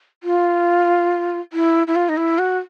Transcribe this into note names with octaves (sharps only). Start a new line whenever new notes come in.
F4
E4
E4
F4
D#4
E4
F#4